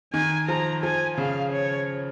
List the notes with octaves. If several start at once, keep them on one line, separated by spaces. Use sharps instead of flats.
D#3 G#5
F3 A#5
F3 G#5
C#3 F5
C#5